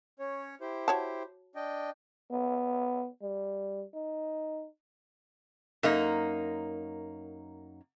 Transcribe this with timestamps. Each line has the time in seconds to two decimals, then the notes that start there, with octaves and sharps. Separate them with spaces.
0.19 C#4 C#5
0.61 E4 G4 C5
0.88 F#4 C#5 A5
1.56 D4 D#5 G5
2.31 B3
3.22 G3
3.94 D#4
5.83 F#2 A#3 D#4